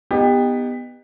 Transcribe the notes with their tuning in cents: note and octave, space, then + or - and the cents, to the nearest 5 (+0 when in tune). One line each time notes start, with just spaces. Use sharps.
B3 +0 D#4 -15 G4 +25